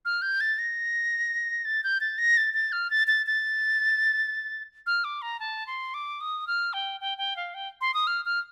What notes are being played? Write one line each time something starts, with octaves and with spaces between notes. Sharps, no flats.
F6
G6
A6
A#6
A6
G6
A6
A#6
A6
A6
F6
A6
A6
A6
F6
D6
A#5
A5
C6
D6
D#6
F6
G5
G5
G5
F5
G5
C6
D#6
F6
F6